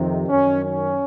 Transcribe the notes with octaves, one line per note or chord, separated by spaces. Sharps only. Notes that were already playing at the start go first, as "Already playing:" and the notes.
Already playing: F2 C3 D#3
F#2 D#3 C#4
C#4